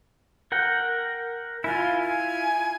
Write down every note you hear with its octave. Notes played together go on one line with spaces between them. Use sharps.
A#4 F#5 G5
E4 F4 G#5
G#5